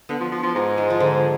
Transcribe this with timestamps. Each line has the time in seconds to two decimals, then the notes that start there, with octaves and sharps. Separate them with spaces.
0.09 D3 B3
0.20 F3
0.32 F3
0.43 F3
0.55 G#2
0.78 G#3
0.90 F3
1.00 D3